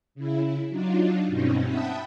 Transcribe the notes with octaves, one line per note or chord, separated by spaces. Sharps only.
C#3 E4
F#3 D4 D#4 F4
G2 B2 C4 C#4 D#4
E5 F#5 G5 A5 B5 D#6